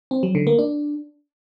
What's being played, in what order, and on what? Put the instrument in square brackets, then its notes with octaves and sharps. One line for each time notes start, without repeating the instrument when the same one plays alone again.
[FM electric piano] C4
F#3
D3
A#3
D4